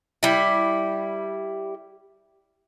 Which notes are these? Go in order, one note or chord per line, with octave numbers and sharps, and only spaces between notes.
G3 E4